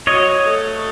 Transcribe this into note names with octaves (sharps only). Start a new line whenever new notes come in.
F#3 C#5 D#5
A3